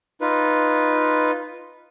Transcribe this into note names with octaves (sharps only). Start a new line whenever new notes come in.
D#4 F4 B4